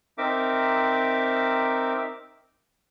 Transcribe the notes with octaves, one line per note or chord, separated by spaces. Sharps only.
C4 D#4 A#4 E5 D6